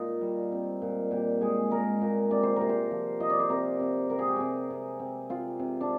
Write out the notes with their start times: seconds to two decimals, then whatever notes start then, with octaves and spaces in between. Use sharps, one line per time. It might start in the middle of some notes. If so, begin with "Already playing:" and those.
Already playing: A#2 D#4 F4
0.21 G3
0.52 C4
0.82 A#2
1.11 A#2 G4
1.41 G#3 G#4
1.71 G#3 A#4
2.02 A#2
2.31 C3 D5
2.43 C5
2.56 C3 A#4
2.69 C5
2.91 F3
3.20 F3 D#5
3.30 D5
3.40 C5
3.50 C3 A#4
3.80 C3
4.10 C3 A#4
4.19 G#4
4.27 G4
4.36 C3 G#4
4.70 C3
4.99 C4
5.30 C4 F4
5.60 C3
5.81 D4